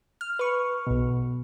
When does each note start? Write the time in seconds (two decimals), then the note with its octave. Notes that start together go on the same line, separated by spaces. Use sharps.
0.21 F6
0.39 B4 C#6
0.87 B1 B2